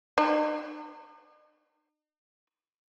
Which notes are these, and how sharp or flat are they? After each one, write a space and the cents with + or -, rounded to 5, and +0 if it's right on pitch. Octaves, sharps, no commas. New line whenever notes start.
D#4 -40